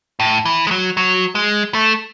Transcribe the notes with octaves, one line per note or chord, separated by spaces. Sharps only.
A2
E3
G#3
F#3
F#3
G#3
A3